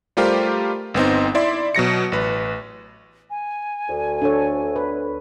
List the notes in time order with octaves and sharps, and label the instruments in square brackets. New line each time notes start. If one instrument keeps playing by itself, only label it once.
[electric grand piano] G3 A3 F4 G4 A#4 C5
G1 B3 C4 D#4
E4 D5 E5 C6
B2 F#3 A#6 C#7
A1 B4
[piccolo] G#5
[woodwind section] D2
[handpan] D4 A4 C#5
B4